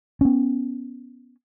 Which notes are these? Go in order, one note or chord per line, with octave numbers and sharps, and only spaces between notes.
B3 C#4